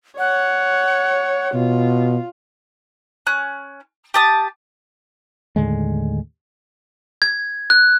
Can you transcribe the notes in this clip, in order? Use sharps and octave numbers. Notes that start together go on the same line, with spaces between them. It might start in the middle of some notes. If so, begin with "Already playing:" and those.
C#5 F#5
B2 F4
C#4 F#6
G4 A5 D#6
D#2 A2 D3 G#3
G#6
F#6